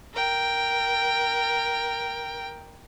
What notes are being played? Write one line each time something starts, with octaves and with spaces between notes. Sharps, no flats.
A#4 G5